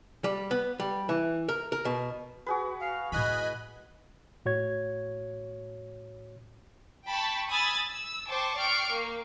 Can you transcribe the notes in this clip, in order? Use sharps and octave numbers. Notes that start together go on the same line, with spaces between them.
G3
B3
G3
E3
A#4
A#4
B2
F#4 G#4 B4
F5
A2 E4 D#5 G#5 B5 F#6
A2 F#4 C#5 G#6
G5 A5 B5 C#6
G#5 B5 D#6 E6 G#6 A6
E6
C5 G5 A5 C#6 D6
D5 G5 C#6 F6 C7 D7
A#3